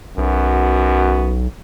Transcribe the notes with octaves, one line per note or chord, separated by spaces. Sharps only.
B1 F#2 B3 F#4